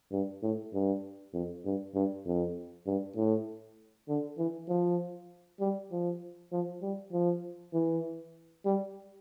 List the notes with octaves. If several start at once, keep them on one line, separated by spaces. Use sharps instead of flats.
G2
A2
G2
F2
G2
G2
F2
G2
A2
D3
E3
F3
G3
F3
F3
G3
F3
E3
G3